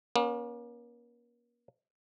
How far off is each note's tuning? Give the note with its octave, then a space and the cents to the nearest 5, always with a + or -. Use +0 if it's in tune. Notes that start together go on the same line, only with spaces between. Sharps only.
A#3 +40 C#4 +10